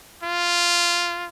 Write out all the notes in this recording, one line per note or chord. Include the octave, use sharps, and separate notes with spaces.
F4